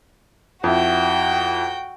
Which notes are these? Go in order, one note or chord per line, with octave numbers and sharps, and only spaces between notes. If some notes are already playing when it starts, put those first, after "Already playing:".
F2 E4 F#4 G5